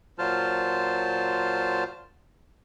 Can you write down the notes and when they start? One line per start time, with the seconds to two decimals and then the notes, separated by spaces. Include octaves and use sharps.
0.19 A#2 F#3 F4 C5 A5 F6